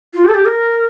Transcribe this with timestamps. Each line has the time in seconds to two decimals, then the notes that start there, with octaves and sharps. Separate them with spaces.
0.14 F4
0.24 G4
0.29 A4
0.34 G4
0.45 A#4